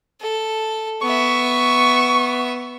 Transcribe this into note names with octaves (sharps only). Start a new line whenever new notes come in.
A4
B3 E5 C#6